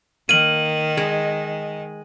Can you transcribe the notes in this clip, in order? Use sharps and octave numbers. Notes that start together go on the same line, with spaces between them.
D#3 A#3 D#7 F#7
G#3